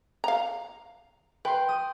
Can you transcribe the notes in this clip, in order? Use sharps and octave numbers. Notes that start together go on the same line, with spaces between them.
F5 A#5
B4 G5 C6
D#6